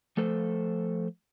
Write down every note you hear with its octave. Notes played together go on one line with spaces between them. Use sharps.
F3 A3 A4 C5